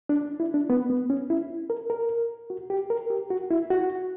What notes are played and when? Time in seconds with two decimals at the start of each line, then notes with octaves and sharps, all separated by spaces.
0.09 D4
0.40 E4
0.54 D4
0.70 B3
0.90 B3
1.10 C#4
1.30 E4
1.70 A#4
1.90 A#4
2.50 F#4
2.70 G4
2.90 A#4
3.10 G4
3.30 F#4
3.50 E4
3.70 F#4